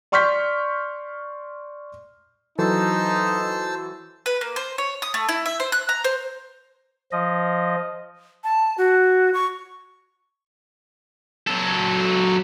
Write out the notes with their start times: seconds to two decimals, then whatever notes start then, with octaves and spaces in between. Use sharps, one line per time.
0.12 D5 C6 C#6 F6 G6 B6
2.59 E3 F#3 D#4 A4 C5 A5 E6
4.26 B4
4.41 A#3
4.56 C5
4.78 C#5
5.02 D#6
5.14 A3
5.29 E4
5.46 E5
5.60 C5
5.72 F#6
5.89 A#5
6.04 C5
7.12 F3 D#5
8.44 A5
8.78 F#4
9.34 C#6
11.47 F#3 A4